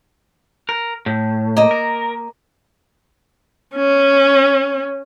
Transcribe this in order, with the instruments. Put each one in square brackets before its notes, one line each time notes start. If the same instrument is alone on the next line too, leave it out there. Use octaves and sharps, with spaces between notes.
[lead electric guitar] A#4
A2
[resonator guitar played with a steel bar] A#3 D#5
[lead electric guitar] A#4
[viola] C#4